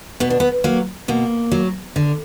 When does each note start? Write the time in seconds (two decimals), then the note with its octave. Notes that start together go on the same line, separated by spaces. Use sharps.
0.20 B2 B3
0.30 D4
0.40 B3
0.64 F#3 A#3
1.08 B2 A#3
1.52 F#3
1.96 D3